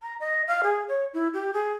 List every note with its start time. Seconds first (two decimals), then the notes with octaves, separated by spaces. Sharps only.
0.02 A#5
0.20 D#5
0.47 F5
0.63 G#4
0.88 C#5
1.13 E4
1.33 G4
1.53 G#4